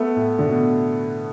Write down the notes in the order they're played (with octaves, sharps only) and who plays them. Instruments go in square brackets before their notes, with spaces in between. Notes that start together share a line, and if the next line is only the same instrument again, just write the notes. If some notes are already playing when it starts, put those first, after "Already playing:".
Already playing: [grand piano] A3 B3
A2
D3
B2